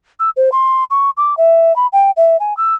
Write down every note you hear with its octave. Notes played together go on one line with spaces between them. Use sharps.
E6
C5
C6
C#6
D6
E5
B5
G5
E5
G#5
E6